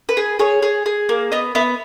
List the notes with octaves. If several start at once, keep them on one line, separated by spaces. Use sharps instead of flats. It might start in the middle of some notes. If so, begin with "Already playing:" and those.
B4
G#4
G#4 C#5
G#4
G#4
A#3
B3 D#5
B3 E5